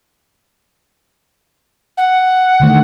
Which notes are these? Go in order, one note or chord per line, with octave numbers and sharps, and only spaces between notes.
F#5
D3 D#3 A3